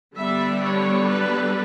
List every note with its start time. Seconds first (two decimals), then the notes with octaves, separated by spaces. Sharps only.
0.16 D3 G3 B3 D4 E5
0.63 C#5
1.10 B4